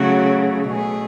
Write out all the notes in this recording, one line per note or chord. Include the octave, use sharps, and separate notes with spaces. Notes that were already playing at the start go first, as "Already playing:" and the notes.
Already playing: C#3 F#3 A3 F#4
B2 A3 G#4